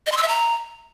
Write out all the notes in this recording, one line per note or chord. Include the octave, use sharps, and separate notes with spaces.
D#5
C6
E6
E5
A#5